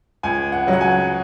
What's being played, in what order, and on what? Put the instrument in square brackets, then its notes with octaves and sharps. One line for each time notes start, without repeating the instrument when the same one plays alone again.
[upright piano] C#2 G#5
F#5
C#3 F#3
F#5
G#5